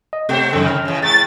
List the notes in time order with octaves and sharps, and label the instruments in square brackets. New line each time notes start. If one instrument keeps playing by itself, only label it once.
[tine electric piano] D#5
[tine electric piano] C3 G5 [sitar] G#3 C5
[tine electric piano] F#2 A4 [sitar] C3 D#3
[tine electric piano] G5 F6
[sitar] C#3 E3
[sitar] G#2 [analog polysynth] A6